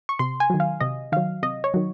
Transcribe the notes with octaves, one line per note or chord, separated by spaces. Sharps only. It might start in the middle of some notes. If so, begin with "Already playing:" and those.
C#6
C3 C6
G#5
D#3 F#3
F5
C3 D#5
D#3 F#3 F5
C3 D#5
C#5
D#3 F#3